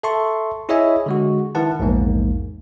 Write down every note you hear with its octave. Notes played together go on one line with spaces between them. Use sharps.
A4 E5 A5 C6 C#6
E4 G#4 C#5 D#5 E5 G#5
D3 G#3 F#4
D#3 E4 B4 F#5 A5
A#1 E2 G#2 A#3